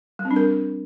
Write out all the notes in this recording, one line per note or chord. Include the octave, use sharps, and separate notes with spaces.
G3
C4
D4
A#4